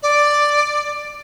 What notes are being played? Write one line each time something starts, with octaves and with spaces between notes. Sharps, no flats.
D5